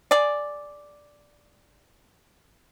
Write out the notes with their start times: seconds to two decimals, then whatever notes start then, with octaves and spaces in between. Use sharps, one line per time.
0.11 G#4 D5